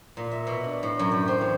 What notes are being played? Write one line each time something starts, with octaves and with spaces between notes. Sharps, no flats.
A#2
E5
B2
D4
A2
F#2
G4
C4
E2